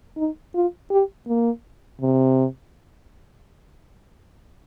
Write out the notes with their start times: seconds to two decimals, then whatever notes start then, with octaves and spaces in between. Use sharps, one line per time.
0.17 D#4
0.55 F4
0.91 G4
1.28 A#3
2.01 C3